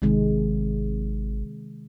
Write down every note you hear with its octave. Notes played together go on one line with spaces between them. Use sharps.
G#1 C3 D#3 G#3